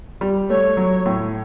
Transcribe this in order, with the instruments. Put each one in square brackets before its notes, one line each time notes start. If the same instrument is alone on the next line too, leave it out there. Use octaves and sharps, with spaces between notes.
[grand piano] G3
[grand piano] A3 [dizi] C#5
[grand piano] F#3
A2